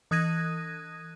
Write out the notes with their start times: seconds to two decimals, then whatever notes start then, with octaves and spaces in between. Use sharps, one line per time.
0.11 E3 D#6 F#6 G#6 A#6 D#7